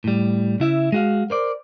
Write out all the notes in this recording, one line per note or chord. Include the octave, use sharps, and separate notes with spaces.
A2 G3
C#3 E4 E5
G#3 F#4 F5
A#4 C5 D5